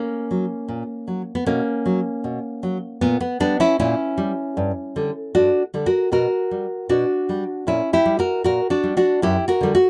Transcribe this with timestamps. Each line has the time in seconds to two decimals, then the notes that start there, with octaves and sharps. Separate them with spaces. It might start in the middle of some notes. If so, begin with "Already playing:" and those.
Already playing: A#3 C#4
0.31 F#3
0.68 A#2
1.08 F#3
1.35 B3
1.46 B2 A#3 C#4
1.86 F#3
2.24 B2
2.63 F#3
3.01 A#2 B3
3.21 B3
3.40 G3 B3 D4
3.60 C#4 E4
3.79 A#2 C#4 E4
4.18 G3
4.57 G2
4.96 D3 G3
5.35 G2 D4 F#4
5.74 D3 G3
5.86 F#4 A#4
6.12 B2 F#4 A#4
6.51 G3
6.89 B2 D4 F#4
7.29 G3
7.67 A#2 C#4 E4
7.93 E4 G4
8.05 G3
8.19 F#4 A#4
8.44 A#2 F#4 A#4
8.70 D4 F#4
8.83 G3
8.97 D4 F#4
9.22 F#2 E4 G4
9.48 F#4 A#4
9.61 D3 G3
9.75 F#4